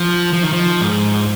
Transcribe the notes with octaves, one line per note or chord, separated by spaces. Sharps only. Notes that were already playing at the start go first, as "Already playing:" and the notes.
Already playing: F3
F3
D#3
F3
G#2